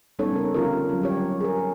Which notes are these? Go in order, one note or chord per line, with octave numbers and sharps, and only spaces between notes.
G3 B3 C#4 D#4 A4 C#5
C#3 C4 A#4
D3 F3 C#4 F4 G4 A#4
F#3 G3 C#4
G3 G4 C#5
G#4 A#4